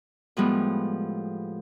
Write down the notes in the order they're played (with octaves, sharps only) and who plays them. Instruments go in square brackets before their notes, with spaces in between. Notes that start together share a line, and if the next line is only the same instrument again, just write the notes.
[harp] A2 F3 G3 G#3 B3